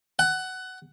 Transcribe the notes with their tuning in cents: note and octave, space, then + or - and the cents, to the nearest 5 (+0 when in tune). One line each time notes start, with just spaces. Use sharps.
F#5 +15